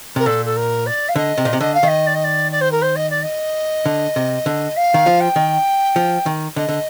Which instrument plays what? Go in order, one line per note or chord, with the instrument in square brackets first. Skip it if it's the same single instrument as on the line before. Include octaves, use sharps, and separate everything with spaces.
[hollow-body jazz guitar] C3 [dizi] A#4
[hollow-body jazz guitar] A#2 [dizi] A4
[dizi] A4
A#4
D5
F5
[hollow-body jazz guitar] D3 [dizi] D#5
[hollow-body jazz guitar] C3
A#2
C3
[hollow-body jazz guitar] D3 [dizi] D#5
[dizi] F5
[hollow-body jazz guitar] D#3 [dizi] D#5
[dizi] D5
D#5
D5
D5
C5
A#4
C5
D#5
D5
D#5
[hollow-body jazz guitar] D3
C3
D3
[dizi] F5
[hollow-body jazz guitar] D#3
F3
[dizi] G5
[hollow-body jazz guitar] D#3
F3
D#3
[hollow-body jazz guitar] D3 [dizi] D#5
[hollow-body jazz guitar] D3